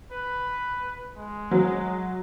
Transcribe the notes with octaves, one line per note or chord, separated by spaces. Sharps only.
B4
G#3
F#3